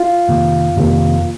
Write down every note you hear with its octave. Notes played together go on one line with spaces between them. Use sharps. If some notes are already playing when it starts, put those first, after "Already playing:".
Already playing: F4 F5
F2 C3 D#3 A#3
F2 C3 D#3 A#3